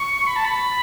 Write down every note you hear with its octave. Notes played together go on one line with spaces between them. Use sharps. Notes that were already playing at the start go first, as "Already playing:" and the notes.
Already playing: C#6
B5
A5
B5